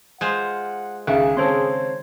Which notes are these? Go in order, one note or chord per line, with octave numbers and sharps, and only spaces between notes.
G#3 F4 C5 F#5
C#2 D#3 G#4 E5 F#6
C#3 C4 A4 C5 C#5 C6